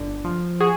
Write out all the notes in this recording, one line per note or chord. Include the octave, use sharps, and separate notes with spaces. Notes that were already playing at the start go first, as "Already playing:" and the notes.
Already playing: G1 D3
F3
F#4 G#4